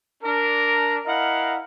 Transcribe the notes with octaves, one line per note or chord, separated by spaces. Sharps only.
D4 A#4
E4 A#4 D#5 F5 F#5